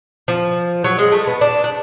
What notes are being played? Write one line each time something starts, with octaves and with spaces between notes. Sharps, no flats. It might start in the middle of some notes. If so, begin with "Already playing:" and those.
F3
F#3
G#3
A3
B3
D4
D4